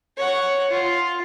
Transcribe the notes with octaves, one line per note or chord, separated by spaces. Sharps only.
C#5 F#5
F4